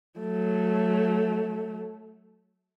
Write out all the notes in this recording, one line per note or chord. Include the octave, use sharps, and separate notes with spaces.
F#3 A3